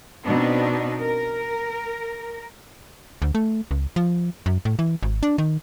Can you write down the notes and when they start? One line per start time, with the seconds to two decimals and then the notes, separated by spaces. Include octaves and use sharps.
0.25 B2 B3 C4 D4 D#4
1.00 A#4
3.22 D2
3.35 A3
3.71 C#2
3.96 F3
4.46 F#2
4.65 A2
4.79 E3
5.02 G#1
5.23 D4
5.38 D#3